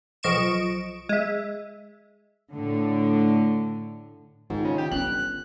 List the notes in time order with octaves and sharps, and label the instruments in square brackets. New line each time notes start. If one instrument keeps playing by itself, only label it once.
[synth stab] B1 F3 D#5 C#6 D7 E7
G#3 E5
[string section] A2 D3
[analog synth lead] G#2 [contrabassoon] D#3 [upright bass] F4
[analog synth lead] C#3
G4
[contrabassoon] G1 [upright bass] C#4 [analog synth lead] F#6